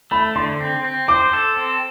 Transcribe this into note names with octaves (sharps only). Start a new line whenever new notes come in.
A3 B5
D3 C6
C4
C4
C5 D6
A4
C4